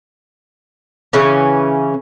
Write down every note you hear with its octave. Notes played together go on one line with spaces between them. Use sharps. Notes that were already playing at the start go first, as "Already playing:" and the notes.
C#3 E3 C#4